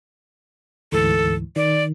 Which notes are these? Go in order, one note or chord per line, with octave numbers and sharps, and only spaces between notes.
D2 G#2 E3 A4
D#3 D5